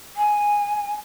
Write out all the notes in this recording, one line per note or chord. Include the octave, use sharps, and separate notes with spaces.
G#5